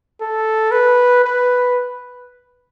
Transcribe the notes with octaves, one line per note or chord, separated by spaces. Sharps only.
A4
B4
B4